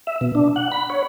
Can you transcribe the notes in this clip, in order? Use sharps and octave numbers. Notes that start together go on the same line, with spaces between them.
E5
B2
D4
F#5
B5
C#5